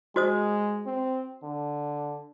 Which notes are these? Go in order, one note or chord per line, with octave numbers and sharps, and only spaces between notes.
G#3 F#4 C5 D#6
C4
D3